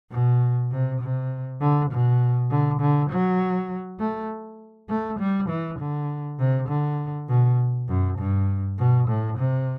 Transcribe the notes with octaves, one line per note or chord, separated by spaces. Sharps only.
B2
C3
C3
D3
B2
D3
D3
F#3
A3
A3
G3
E3
D3
C3
D3
B2
F#2
G2
B2
A2
C3